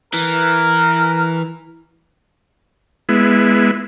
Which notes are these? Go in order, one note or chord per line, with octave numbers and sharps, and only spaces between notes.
E3 A#4
G#3 B3 E4